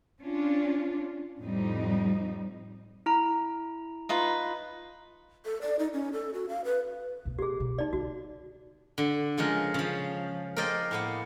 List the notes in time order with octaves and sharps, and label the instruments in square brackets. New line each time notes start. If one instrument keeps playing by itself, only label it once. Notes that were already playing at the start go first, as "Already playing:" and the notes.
[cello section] C#4 D4 F4
F2 A2 G3 C4 D#4
[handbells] E4 A#5
[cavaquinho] D#4 F4 B4
[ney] A4
D5
D#4
C#4
A4
F#4
F5
B4
[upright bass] B2 B3
[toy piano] G4 G#4
[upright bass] B2
[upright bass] C4 [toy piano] D#4 D5
[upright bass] D3 D#3 [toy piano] F#4
[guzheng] D3
C#3 F3 G#3 A#4
C#3 F3
A#4 C5 D5 D#5 G5
A2 A#3 B3